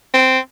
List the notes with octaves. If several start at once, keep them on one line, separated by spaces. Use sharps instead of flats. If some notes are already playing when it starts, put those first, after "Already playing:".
C4